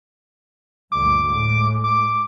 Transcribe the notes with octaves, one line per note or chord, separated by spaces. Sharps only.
D2 G2 A#2 D6
A2 G#3
D6